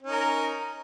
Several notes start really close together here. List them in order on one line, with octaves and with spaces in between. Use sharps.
C#4 D#4 A#4